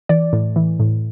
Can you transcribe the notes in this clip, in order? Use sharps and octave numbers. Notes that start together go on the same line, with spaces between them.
E3 D5
A2
E3
A2